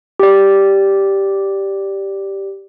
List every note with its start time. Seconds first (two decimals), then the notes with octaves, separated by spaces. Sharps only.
0.19 G4 D5